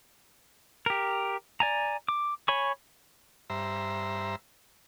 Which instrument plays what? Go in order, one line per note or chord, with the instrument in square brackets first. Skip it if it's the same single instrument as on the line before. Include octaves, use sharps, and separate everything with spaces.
[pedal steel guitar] G4 A#4
D5 G#5 A#5
D6
C#5 G#5 B5 C#6
[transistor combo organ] G2 C5 E5 A#5